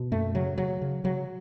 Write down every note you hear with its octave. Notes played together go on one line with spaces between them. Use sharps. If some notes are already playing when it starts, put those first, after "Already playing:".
Already playing: B2
F#2 A3
C#3 F#3
C#3 F#3
C#3
C#3 F#3